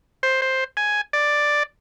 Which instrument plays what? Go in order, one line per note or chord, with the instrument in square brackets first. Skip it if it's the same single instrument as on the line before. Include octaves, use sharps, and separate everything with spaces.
[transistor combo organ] C5
C5
G#5
D5